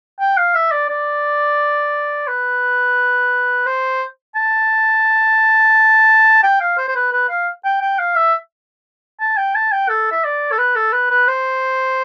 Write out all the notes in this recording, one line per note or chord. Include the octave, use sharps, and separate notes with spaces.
G5
F5
E5
D5
D5
B4
C5
A5
G5
F5
C5
C5
B4
B4
F5
G5
G5
F5
E5
A5
G5
A5
G5
A4
E5
D5
A4
B4
A4
B4
B4
C5